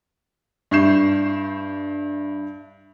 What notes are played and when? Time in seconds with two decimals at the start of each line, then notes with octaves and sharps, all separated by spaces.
0.71 G2 E4 C#6 G6 C7 E7